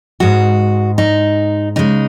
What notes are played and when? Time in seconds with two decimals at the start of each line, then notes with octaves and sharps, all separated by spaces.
0.20 G#2 G#3 F#4
0.98 D#4
1.76 C#3 G#3 D#4